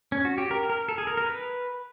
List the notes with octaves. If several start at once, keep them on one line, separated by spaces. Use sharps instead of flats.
C#4
F#4
G4
A#4
A#4
A4
G#4
A#4
A#4
B4